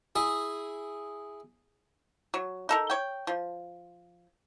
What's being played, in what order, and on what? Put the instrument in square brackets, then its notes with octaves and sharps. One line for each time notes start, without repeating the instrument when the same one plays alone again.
[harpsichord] E4 G#4
[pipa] F#3
D#4 A4 A#4
C#5 G5
F3